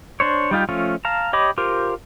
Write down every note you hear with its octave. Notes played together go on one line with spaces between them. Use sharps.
D4 C5 C#5
G3 D#4 F4 G4
F3 A3 C#4 F4
F5 A5 A#5
G4 C#5 D#5 B5 D6
F4 G4 A#4 C5